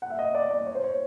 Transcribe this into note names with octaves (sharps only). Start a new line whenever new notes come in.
F#5
E5
D#5
D5
D5
C#5
C5
C#5